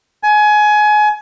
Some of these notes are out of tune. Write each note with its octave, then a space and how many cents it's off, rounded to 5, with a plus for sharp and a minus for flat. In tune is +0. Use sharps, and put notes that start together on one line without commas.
G#5 +25